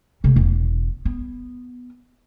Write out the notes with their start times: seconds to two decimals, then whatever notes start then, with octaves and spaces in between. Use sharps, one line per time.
0.24 C3 A3
0.36 E1
1.05 B3